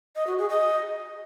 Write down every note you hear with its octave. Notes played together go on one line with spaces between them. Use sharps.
D#5
F#4
G#4
D#5